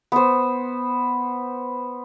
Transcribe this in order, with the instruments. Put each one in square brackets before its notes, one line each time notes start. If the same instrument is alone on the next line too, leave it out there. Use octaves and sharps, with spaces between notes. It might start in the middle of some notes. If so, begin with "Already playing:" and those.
[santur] B3 C5